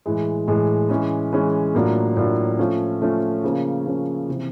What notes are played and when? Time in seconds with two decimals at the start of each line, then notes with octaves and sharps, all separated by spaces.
0.06 A2 E3 G#3
0.48 A2 E3 G#3
0.89 E3 G#3 C#4
1.33 E3 G#3 C#4
1.75 A2 F#3 A#3 D4 F4
2.17 A2 F#3 A#3 D4 F4
2.59 F3 A3 C#4 F4
3.02 F3 A3 C#4 F4
3.44 C#3 F3 A#3 C#4
3.86 C#3 F3 A#3 C#4
4.29 C3 E3